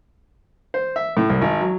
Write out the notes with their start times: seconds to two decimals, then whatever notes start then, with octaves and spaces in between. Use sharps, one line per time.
0.74 C5
0.96 E5
1.17 A2
1.29 C2
1.41 G#1
1.60 F#3